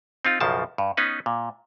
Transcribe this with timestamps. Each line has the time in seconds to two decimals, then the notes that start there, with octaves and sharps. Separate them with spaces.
0.25 C4 D#4 F4
0.40 B1 F#2 C#3 F3 A5
0.78 G2
0.97 B3 C#4 D#4 B4
1.26 A#2